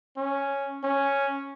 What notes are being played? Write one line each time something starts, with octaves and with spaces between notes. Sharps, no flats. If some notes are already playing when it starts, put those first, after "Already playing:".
C#4
C#4